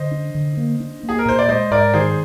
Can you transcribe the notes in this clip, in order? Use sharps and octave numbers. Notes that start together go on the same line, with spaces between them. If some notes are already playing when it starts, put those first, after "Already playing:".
Already playing: D3 C5 D#5
D4
D3
A#3
D4
A#3
G#4
A#4
A#2 C5
D5
G#3 C5 D#5
G#2 A#4 D5
D#3 G#4 C5